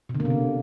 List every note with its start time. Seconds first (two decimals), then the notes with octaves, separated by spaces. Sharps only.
0.09 B2
0.15 D3
0.20 A#3
0.25 C3
0.30 D3